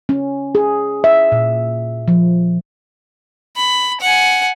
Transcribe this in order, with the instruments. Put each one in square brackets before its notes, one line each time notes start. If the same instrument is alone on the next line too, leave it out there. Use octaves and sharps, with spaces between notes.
[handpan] C#4
G#4
E5
A#2
F3
[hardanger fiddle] B5
F#5 G#5